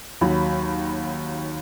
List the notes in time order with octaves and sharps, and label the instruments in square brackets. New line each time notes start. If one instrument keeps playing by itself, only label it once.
[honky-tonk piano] D#2 F#3 B5